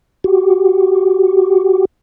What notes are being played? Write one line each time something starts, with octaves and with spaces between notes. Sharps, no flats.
F#4 G4